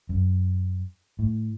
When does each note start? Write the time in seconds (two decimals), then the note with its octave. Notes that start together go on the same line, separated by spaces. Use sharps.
0.09 F#2
1.19 A2